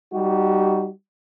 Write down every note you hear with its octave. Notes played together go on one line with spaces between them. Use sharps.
G3 D#4 F#4 G4